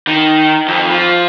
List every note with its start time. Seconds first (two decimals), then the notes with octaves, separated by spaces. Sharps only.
0.07 D#3
0.68 F2
0.90 F3